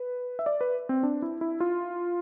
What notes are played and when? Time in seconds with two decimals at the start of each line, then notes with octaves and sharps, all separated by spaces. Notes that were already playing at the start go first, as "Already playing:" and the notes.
Already playing: B4
0.39 E5
0.46 D5
0.61 B4
0.89 C4
1.03 D4
1.22 E4
1.41 E4
1.60 F4